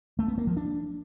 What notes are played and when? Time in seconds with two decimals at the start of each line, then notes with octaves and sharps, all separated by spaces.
0.19 A3
0.28 B3
0.38 A#3
0.47 F3
0.57 D4